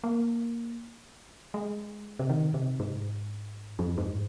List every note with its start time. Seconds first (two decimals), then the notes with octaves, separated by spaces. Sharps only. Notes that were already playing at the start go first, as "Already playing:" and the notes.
0.04 A#3
1.54 G#3
2.19 C3
2.29 D#3
2.54 C3
2.80 G#2
3.79 F2
3.98 G#2